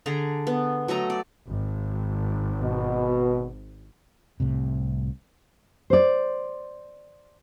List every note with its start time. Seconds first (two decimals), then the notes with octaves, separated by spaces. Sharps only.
0.06 D3 G#4 A#5
0.47 B3
0.88 F#3 A3 D#5 A#5
1.10 D5
1.46 G#1
2.61 B2
4.40 C2 A2 C3
5.90 C5 D5